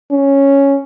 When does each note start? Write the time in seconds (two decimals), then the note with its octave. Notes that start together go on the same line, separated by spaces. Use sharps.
0.12 C#4